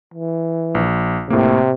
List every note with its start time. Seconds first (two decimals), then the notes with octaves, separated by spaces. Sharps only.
0.14 E3
0.75 A#1
1.30 A2 C3 A#3